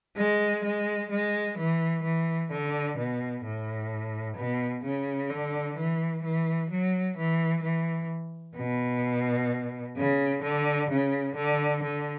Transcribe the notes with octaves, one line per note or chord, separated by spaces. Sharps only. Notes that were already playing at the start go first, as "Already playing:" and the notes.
G#3
G#3
G#3
E3
E3
D3
B2
A2
B2
C#3
D3
E3
E3
F#3
E3
E3
B2
C#3
D3
C#3
D3
D3